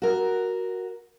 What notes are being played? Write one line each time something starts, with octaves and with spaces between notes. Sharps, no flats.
F#4 A#4